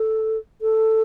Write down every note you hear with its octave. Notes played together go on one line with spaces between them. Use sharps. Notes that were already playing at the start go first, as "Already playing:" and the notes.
Already playing: A4
A4